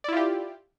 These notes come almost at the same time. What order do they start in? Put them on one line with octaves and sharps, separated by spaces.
D5 E4 F4 G4